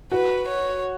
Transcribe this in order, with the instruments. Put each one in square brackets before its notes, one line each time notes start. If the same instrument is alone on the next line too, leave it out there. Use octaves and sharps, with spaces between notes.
[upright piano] F#4 [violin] B4
[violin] C#5